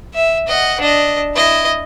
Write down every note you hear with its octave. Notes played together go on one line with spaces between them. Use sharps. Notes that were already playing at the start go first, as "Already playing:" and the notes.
E5
D#5 F#5
D4 D#5
E4 D#5